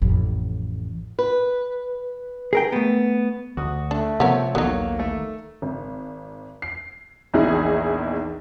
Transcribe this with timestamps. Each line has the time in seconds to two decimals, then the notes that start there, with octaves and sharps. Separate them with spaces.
0.02 A1 F2
1.19 B4
2.53 G#4 A#4 G5
2.72 A3 B3
3.57 D2 F#4 D#6
3.91 A3 D4
4.20 C3 F3 B3 C4 A4 A#4 C#5
4.55 D#1 A#1 D#3 F#3 A#3 B3 D#4 A4
4.99 A3 A4
5.62 G#1
6.62 C7
7.34 A#1 E2 D#4 E4 G#4